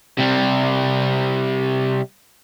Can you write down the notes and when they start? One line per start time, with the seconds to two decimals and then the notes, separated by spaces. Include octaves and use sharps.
0.18 C3 G3